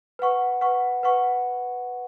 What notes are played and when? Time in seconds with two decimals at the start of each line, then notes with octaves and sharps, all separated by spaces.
0.19 B4 F#5 C#6
0.61 B4 F#5 C#6
1.03 B4 F#5 C#6